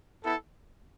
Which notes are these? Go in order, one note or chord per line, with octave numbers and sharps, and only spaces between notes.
B3 E4 A4